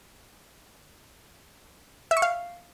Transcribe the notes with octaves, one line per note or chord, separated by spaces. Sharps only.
E5
C#6
F5